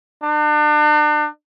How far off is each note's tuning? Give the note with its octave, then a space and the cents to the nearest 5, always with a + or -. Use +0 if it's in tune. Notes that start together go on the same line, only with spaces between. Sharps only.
D4 +40